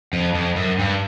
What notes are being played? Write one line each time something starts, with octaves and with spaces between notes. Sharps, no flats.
F2
F2
F#2
G2